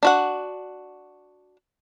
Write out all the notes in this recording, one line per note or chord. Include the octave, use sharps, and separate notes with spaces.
D4 F#4 F#5